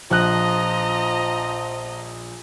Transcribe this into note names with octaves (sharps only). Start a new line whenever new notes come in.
A#1 F3 D#5 A#5 F#6